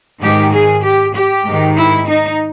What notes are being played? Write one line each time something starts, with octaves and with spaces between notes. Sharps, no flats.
G#2 D#3 G4
G#4
G4
G4
G#2 D#3
E4
D#4